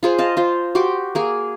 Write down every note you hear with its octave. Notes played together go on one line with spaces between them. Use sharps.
F4 G#4 C5
D#5 F5 A5
F4 C5
F#4 G4 C6 D6
A#3 G#4